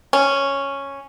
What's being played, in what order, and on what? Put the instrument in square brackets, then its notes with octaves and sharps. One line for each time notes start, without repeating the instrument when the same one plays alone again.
[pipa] C#4